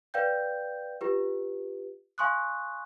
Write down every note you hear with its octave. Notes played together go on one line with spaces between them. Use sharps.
B4 D5 F5 G5 G6
F4 G4 B4
F5 G#5 C6 C#6 D#6 F#6